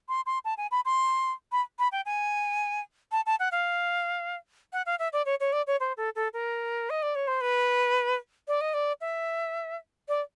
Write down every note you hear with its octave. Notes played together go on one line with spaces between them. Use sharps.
C6
C6
A5
G#5
B5
C6
B5
B5
G5
G#5
A5
A5
F#5
F5
F#5
F5
E5
D5
C#5
C#5
D5
C#5
C5
A4
A4
A#4
D#5
D5
C#5
C5
B4
D5
D#5
D5
E5
D5